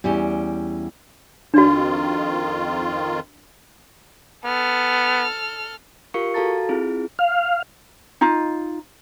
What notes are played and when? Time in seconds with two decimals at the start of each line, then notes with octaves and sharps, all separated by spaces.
0.04 E2 G3 C#4 G4
1.54 F2 D#3 D4 F4 F#4
4.45 B3 A4 F6
6.14 F4 G4 A#4 F5 C#6 C#7
6.34 F#4 A4 F5 A5 A#5 A6
6.69 C4 E4 F4 G#4
7.19 F5
8.21 D#4 F4